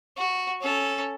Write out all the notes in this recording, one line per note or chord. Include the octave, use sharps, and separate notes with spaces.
F#4
C#4 A4